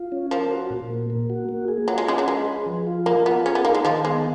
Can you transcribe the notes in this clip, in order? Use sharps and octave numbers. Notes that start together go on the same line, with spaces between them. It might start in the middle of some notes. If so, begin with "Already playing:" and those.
Already playing: F4
C#4
F3 A#4
F#4
A#2
A#3
A#3
F#4
A#3
G#4
F#3 F4
G#3
G#3 C#4
F#3
G#3 B4
G#4
F3
F4
A#3 A#4
B3 F4
C#4 G#4
B3
A#3 D#4
G#3
D#3 F3
G#3 B3